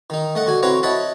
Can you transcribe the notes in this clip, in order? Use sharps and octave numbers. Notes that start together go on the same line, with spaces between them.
D#3 D#4
A3 D#5 F#5
D3 F#4 G#5
C4 E4 F#4 B4 C#5 A#5
C#5 D#5 E5 F#5 A5 B5